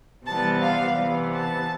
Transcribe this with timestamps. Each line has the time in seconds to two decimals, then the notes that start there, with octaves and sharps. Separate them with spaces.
0.25 C3 E3 G3 B3 A5
0.61 F5
0.97 C3 E3 B3
1.33 A5